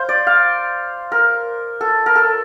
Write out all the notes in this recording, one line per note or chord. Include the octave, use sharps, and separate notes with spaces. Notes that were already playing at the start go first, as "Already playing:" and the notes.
Already playing: C5 F5
D5
F5
A#4
A4
A#4
A4